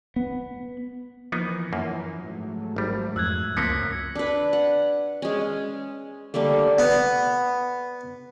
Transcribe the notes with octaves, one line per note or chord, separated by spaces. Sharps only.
B3
E3 F3 A#3 B3 D#4
F#2 A#3
G#2 F#3 A3
G#1 G3
F2 E6 F#6 G#6
C#2 F#2 F3 A#3 C4 B6 C#7
D4 B4
F#5
G#3 C#4
D3 G3 A3 A#3
B3